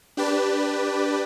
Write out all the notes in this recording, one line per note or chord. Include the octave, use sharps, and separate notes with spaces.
D4 G4 B4 D5